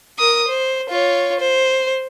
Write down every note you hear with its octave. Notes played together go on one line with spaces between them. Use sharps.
A#4 D#6
C5
F4 C#5
C5